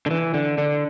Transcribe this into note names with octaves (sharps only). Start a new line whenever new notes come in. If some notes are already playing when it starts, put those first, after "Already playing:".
D3
E3
D3
D3